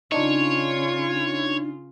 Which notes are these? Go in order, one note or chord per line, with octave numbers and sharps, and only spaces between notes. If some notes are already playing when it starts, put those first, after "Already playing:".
C#3 D4 D#4 F4 C#5